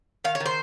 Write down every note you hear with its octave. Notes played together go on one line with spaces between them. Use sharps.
D#3 F5
C#5
D#3
C5